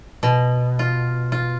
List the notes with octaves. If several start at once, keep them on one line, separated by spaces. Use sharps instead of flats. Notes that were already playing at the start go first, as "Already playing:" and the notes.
B2
F4
F4